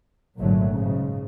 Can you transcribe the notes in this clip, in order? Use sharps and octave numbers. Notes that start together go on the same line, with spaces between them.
G#1 A#2 D3 F#3 A3
G#2 C#3